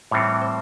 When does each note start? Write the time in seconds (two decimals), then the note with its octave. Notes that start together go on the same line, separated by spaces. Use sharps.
0.11 A2 E3 G3 C4 C#5
0.42 C5